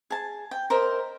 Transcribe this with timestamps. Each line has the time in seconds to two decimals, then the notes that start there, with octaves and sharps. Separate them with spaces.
0.10 G#4 A5
0.51 G5
0.70 A#4 C5 D#5 E5